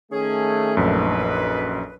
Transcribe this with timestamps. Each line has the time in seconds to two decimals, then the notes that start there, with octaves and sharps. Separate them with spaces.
0.11 D#3 A3 C#4 G#4
0.77 A#1 F#2 D#4 A4 B4